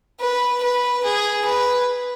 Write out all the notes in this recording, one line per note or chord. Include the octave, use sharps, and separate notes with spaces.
B4
B4
G#4
B4